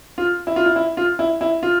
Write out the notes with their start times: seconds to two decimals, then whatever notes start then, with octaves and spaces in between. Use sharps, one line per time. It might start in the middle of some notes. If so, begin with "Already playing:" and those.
0.18 F4
0.47 E4
0.56 F4
0.66 E4
0.76 E4
0.97 F4
1.19 E4
1.41 E4
1.63 F4